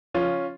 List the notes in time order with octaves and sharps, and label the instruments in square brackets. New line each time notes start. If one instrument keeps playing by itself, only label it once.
[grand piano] C#3 F3 C#4 F4